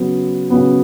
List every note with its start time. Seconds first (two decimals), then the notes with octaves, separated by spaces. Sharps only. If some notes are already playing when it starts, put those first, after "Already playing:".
Already playing: C#3 F#3 B3
0.50 C#3 F#3 B3